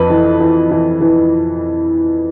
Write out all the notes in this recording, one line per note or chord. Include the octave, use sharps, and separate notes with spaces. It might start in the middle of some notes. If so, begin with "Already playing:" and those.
Already playing: F2 B4
E3
E3
E3
E3